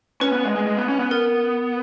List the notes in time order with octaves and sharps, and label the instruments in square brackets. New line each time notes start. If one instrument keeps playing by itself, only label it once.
[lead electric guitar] C#4 [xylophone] B4
[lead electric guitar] B3
G#3
G#3
G#3
B3
C#4
B3
[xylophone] A#4